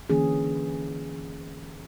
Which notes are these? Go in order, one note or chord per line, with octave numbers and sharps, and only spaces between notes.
D3 E3 A#3 C#4 G#4